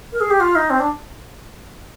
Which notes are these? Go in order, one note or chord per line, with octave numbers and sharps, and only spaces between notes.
A#4
G#4
G4
F4
D#4
C4
D4